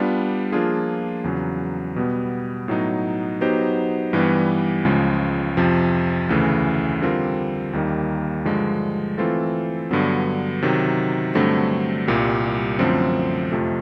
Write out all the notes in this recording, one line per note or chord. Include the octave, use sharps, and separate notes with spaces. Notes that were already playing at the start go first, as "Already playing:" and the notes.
Already playing: G3 B3 D4 F4
F3 A#3 D4 F4 G#4
E2 C#3 F#3
B2 G3 B3
A2 F#3 B3 D#4
F#3 B3 D#4 G4 C5
G2 E3 G3 B3
C#2 C#3 F3 G#3
F2 C3 F3
D2 C#3 E3 A3
D3 G3 C4 F4 A#4
D#2 D#3 G3 A#3 D#4
G2 D3 F3 G#3
E3 A3 C4 F4 A4
G2 D3 F#3 B3
C3 D#3 F#3
G2 D3 F#3 A3 C4
C2 A#2 G3
F#2 D3 F3 A3 C4
F2 C3 F3 A3